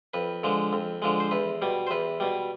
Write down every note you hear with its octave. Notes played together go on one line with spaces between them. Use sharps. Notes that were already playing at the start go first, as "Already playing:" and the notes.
F2 B4
D3 F3 G#3
F2
D3 F3 G#3
C5
E2 B4
B2 G3
C5
E2 B4
B2 G3